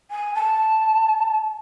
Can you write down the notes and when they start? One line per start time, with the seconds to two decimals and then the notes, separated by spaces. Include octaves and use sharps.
0.11 G#5
0.35 A5